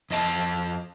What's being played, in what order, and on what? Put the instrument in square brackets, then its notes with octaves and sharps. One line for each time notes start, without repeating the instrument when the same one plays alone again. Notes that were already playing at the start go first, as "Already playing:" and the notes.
[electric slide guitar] F2 D#5 A5